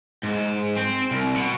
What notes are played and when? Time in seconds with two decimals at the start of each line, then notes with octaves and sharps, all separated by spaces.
0.23 G#2
0.77 C4
1.11 C2
1.36 B2